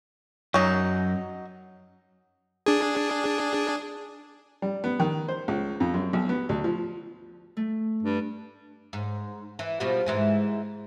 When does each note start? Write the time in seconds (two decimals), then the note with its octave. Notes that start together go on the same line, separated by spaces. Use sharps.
0.54 F#2 F#3 D#4
2.66 D4 G#4
4.62 G3
4.84 B3
5.00 D#3
5.28 C5
5.48 C#2
5.80 F2
5.94 F#2
6.13 B1
6.29 B3
6.49 D2
6.64 F3
7.57 A3
8.03 G2
8.93 G#2
9.59 E3
9.80 B2 F3 G3
10.06 G#2 E3 G#3